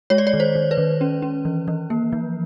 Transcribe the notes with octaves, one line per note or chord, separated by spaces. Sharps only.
G#3 C#5
D5
C#5
D#3
C5
D#3
B4
D#3
C#4
C#4
E3
E3
A#3
F3